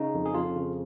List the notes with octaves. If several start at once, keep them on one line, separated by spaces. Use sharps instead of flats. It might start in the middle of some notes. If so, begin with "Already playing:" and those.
Already playing: C#3 D#4
F2
G#4
F2 F4
C#3